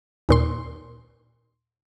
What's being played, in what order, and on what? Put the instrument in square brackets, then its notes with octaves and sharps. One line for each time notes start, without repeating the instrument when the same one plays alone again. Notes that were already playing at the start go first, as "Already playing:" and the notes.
[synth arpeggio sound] D#2 A#2 C6